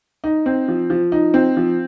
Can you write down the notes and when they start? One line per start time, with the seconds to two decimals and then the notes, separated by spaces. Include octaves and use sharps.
0.24 D#4
0.46 C4
0.68 F3
0.90 F3
1.12 D#4
1.34 C4
1.57 F3